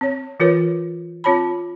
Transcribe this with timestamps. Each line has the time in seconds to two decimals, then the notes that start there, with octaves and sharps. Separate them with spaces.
0.01 C4 C#5
0.40 E3 F4 A#4 B4 C#5
1.24 C4 F4 C#5 A5 B5